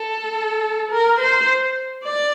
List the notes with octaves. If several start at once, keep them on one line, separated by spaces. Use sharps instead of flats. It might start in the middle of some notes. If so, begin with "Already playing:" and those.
Already playing: A4
A#4
C5
D5